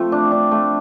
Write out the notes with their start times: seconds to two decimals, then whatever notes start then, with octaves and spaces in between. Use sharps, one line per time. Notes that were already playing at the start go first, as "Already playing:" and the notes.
Already playing: F3 A3 C4
0.12 D4
0.32 D4
0.51 A3